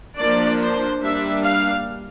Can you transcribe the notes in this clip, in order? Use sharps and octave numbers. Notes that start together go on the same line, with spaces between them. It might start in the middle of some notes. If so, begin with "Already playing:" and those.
F3 A#3 D4 D5
C5
G3 A#3 D4 E5
F5